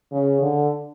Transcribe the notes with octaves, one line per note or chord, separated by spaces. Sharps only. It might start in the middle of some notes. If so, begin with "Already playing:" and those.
C#3
D3